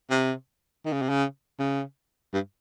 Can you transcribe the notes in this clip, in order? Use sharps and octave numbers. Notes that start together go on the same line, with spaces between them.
C3
D#3
C#3
C3
C#3
C#3
G2